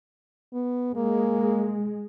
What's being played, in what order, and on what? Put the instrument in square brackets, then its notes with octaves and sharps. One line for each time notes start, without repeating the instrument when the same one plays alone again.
[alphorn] B3
[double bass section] G#3 [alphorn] A#3